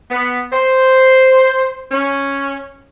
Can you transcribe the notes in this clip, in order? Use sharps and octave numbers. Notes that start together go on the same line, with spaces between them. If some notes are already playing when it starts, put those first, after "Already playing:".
B3
C5
C#4